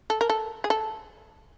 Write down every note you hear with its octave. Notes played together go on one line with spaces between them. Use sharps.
A4
A#4
A4
G#4
A4